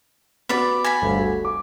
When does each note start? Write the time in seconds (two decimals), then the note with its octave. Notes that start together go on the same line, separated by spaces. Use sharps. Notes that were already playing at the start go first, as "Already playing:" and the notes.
0.49 B3 F#4 D5 B5
0.84 G#5 B5
1.02 G1 D2
1.18 F#4 A4
1.45 D6